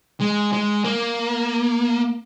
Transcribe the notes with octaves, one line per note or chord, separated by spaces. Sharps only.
G#3
G#3
A#3